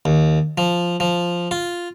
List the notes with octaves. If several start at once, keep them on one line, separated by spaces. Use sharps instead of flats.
D#2
F3
F3
F4